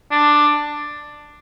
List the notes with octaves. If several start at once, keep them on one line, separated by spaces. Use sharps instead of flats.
D4